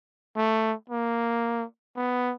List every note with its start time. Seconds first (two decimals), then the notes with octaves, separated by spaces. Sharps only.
0.36 A3
0.90 A#3
1.96 B3